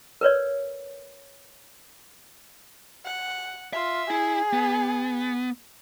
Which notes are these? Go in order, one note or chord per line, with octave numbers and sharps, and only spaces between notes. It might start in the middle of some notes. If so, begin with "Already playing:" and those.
A#4 B4 C#5 D5
F#5
F4 E5
E4 G#4
B3